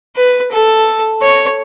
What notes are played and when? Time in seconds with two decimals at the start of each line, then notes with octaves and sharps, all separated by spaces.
0.16 B4
0.52 A4
1.22 C#5